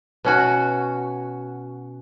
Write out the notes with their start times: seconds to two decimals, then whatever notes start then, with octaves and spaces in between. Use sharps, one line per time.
0.24 B2 C#4 F#4